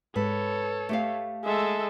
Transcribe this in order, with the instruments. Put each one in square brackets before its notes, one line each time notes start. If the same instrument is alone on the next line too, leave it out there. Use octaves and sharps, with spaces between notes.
[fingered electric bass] G#2 [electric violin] A4 C#5 [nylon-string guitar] B4
[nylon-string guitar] A3 G4 F5
[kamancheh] G#3 [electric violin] A4 E5